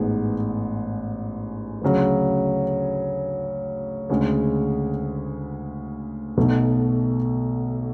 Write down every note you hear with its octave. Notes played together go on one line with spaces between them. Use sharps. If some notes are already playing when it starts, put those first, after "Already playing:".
Already playing: A1 G#2 G#3 B3
D2 C#3 F#3
D2 C#3 G#3
B1 B2 A3